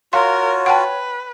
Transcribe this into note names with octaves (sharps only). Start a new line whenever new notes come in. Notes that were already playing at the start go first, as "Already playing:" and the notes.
F4 F#4 A#4 C#5 F5 C6
B4 F#5 G5 A5